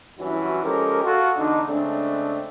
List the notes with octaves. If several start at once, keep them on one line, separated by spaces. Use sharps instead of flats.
G2 E3 F#3 C#4 E4 F#4
F3 G#3 C#4 G4 A4 A#4
F4 F#4 A4
E2 D3 D4 D#4
C#3 G#3 A3 C4 D4